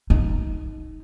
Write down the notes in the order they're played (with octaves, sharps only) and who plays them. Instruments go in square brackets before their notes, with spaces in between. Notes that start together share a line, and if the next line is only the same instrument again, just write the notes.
[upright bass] D#4